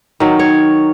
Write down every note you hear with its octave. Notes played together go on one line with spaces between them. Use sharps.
D#3 F#3
C#5